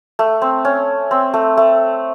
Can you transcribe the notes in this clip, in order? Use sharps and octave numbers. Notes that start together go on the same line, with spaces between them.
A3
C4
C#4
C4
A3
A3